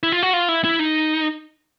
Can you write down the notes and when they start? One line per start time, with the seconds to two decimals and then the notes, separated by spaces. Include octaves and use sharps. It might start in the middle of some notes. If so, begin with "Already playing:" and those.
0.03 E4
0.12 F4
0.23 F#4
0.33 F4
0.49 E4
0.64 E4
0.79 D#4